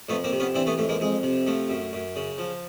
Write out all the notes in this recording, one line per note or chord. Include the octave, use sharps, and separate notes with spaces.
F2 A3 B3
A#3 C4
C3
B3 C#4
E3 C4 D4
A3 B3
F2 A3
G#3 A#3
F2 G#3
C3
F3 A3
F#2
F#2
C#3
F3